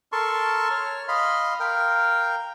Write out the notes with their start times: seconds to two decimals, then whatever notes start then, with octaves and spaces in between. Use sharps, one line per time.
0.12 A4 A#4 A5 C6 C#6
0.71 C#5 F6
1.08 D#5 F5 B5 C6
1.60 A#4 F5 G5